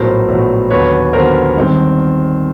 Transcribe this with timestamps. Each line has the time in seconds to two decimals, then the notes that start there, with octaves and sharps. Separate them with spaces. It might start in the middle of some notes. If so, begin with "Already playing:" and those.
Already playing: A#1 A2 F#3 B3 A#4 C5
0.28 A#1 A2 F#3 B3
0.70 D#2 D3 F#3 B3 B4 C#5
1.13 D#2 D3 F#3 B3 A#4 C5
1.56 G1 G2 D#3 G#3 C4